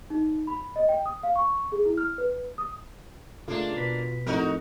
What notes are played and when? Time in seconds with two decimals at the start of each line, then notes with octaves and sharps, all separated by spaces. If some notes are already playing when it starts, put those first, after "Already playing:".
0.10 D#4
0.47 B5
0.76 D#5
0.89 G5
1.06 D#6
1.23 F5
1.36 C#6
1.72 G#4
1.86 E4
1.97 F6
2.18 B4
2.58 D#6
3.48 C#3 A3 A#3 D4 F4
3.77 B2 B4 B6
4.26 F2 A2 D#4 F#4 A#4